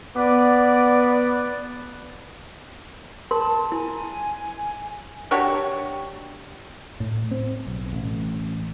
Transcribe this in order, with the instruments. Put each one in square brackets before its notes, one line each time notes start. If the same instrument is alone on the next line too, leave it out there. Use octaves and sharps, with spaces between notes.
[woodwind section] B3 B4 D5
[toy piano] A#4 C6 [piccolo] A5
[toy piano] E4 [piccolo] G#5
[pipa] D4 F#4 G4 C#5
[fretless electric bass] A2
C4
B1
A1